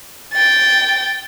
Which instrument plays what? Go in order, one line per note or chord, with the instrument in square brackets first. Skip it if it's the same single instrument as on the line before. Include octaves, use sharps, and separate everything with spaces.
[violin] G5 A6